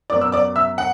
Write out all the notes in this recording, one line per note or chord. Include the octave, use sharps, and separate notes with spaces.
F#2 F#3 B3 D5 D6
E6
D5 D6
E5 E6
F#5